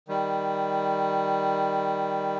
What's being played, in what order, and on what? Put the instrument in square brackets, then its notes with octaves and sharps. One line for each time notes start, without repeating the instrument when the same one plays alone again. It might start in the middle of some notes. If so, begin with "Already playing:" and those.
[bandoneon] D#3 G3